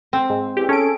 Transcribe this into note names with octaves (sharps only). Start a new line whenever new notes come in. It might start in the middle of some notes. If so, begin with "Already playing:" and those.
C4
G#2
E2 G4
C#4 G#4 A4 D7